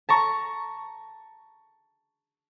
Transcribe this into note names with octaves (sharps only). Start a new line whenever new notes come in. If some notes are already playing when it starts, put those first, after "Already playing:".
A5 A#5 C#6